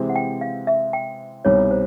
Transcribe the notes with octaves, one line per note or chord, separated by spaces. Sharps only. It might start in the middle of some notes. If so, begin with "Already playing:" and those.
Already playing: C3 E3 G#3 C4
F#5
G5
F5
E5
G5
C2 B2 G3 C4 D#4 C#5
C5